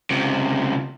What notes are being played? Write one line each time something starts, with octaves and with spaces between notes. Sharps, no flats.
C#2 C3